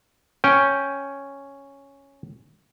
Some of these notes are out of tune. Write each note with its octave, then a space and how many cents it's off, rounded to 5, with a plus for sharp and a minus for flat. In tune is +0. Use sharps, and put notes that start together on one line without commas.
C#4 +0 G5 +0